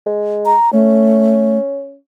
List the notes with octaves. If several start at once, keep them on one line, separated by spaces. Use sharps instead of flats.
G#3
A#5
A3 C#4